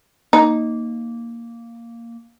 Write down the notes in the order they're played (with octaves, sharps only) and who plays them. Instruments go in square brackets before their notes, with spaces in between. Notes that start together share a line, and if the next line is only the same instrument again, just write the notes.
[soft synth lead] A#3 [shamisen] D#4